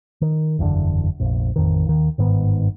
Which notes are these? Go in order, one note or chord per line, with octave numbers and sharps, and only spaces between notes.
D#3
F#1 E2 G2 D3
F1 A#1
A1 F2 D#3
D#2 D#3
G1 G#2 D#3 B3